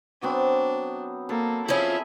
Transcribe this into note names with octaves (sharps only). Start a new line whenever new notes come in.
F#3 B3 C4 D4
A#3 A4
F3 C#4 E4 G#4 E5